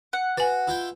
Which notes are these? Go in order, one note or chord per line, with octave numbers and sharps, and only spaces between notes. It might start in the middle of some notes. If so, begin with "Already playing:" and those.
F#5
F#4 B4 G#5
E4 F4 G5